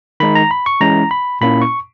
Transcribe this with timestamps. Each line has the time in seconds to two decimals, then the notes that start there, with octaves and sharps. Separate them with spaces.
0.20 D#3 G#3 D#4 B5
0.35 A#5
0.51 B5
0.66 C#6
0.81 E3 G#3 C#4 E4 A#5
1.11 B5
1.41 A#2 A#3 C#4 E4 B5
1.62 C#6